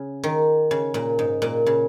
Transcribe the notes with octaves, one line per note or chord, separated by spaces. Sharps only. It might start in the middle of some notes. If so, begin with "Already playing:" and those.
Already playing: C#3
D#3
C#3
A#2
G#2
A#2
C#3